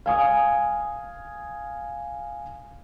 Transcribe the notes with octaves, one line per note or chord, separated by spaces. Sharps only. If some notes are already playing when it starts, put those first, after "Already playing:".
F5 G#5 D#6